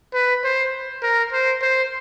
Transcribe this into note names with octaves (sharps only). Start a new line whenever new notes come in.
B4
C5
A#4
C5
C5